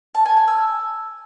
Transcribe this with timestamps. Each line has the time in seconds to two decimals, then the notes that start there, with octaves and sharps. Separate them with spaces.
0.15 A5
0.26 G#5
0.37 G#5
0.48 E6